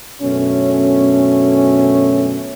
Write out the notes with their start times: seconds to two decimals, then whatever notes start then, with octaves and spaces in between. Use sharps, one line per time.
0.22 F#2 B2 D3 A3 C#4